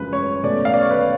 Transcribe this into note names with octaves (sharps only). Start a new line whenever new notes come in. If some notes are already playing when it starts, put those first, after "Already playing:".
Already playing: F#2 C#3 F3 G#3 C#4 B4
C#5
B2 A3 C#4 D5
F5
D5
C#5
B4